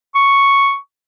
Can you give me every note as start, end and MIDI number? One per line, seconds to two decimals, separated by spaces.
0.15 0.77 85